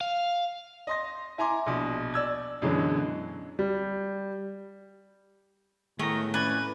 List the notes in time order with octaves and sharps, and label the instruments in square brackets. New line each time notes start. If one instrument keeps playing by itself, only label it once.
[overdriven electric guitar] F5
[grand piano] D#5 C6 A#6
E4 G#5 A#5 C6 D6
A#1 B2
D5 E6 G#6
F#2 B2 D3 E3 F#3 G#3
G3
[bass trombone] A2 [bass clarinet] D#3 [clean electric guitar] G#3 B3 A#5 [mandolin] A3
[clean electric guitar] F2 D5 G#5 [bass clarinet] C#4 [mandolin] B4